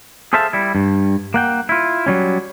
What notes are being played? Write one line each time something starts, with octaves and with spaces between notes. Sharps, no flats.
G#4 A4 C5 E5 F5 A5
G3 E4
G2
A#3 F#5 G5
E4 F4
F#3 G3 C#4